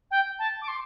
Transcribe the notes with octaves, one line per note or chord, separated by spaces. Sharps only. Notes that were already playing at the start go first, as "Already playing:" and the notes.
G5
A5
D6
C6